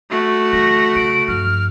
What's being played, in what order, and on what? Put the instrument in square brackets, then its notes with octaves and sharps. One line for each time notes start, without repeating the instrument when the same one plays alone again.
[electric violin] A3 F#4
[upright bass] D3 E3 [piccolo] A#6
[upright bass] C#3 [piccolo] D7
[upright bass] G2 F3 [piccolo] F6